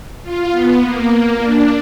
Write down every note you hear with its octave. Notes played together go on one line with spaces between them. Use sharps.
F4
B3
A#3
D4